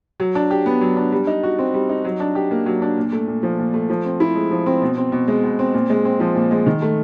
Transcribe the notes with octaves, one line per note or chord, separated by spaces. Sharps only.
F#3
D4
G4
B3
F#3
D4
G3
D#4
F#4
C4
G3
D#4
F#3
D4
G4
A#3
F#3
D4
A#2
A3
A#2
F3
A#2
A3
F3
C4
E4
G#3
F3
C4
B2
C4
B2
G#3
B2
C4
A#2
G#3
C4
F3
A#2
G#3
D#3
A3